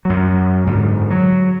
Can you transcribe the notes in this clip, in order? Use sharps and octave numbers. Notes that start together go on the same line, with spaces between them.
F#2 F#3
G#2 D3
F#3